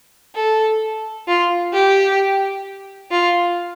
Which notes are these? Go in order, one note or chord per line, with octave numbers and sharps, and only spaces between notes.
A4
F4
G4
F4